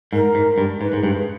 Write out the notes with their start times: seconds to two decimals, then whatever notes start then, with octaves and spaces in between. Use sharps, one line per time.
0.13 G#2 A#4
0.35 G#2
0.58 G2
0.81 G#2 B4
0.93 G#2 G#4
1.03 G2
1.15 G#4